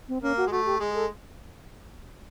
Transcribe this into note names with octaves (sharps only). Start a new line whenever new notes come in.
C4
A#3 C#4
F#4
G#3
A3 F#4
G4
G#3 G#4
A4